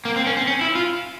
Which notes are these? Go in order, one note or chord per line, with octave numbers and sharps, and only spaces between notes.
A#3
C4
C#4
C4
C#4
E4
F4